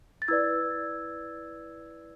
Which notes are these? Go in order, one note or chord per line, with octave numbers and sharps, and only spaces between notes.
A6
E4 B4 D5 E6 G#6